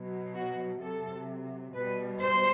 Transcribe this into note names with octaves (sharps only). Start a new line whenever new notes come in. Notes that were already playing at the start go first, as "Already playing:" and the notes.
Already playing: B2 F#3
F#4
C3 F#3 A4
B2 G3 B4
C5